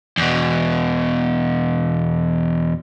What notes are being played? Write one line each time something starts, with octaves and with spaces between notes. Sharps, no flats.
E2 B2